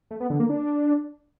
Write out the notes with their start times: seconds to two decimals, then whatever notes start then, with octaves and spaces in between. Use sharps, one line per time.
0.11 A3
0.20 B3
0.30 D3
0.40 A#3
0.49 D4